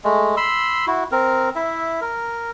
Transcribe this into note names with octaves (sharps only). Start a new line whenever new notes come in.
G#3 A3
B5 C6 E6
E4 F#4
C4 A#4
E4 E5
A#4